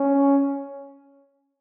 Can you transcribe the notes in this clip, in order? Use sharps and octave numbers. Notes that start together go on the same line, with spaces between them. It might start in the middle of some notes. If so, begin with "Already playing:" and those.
Already playing: C#4